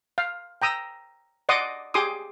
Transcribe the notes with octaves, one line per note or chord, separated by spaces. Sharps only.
F5
G5 A#5 D#6 E6
D5 D#5 F#5 C6 D6 D#6
G4 G#4 C6 D6 D#6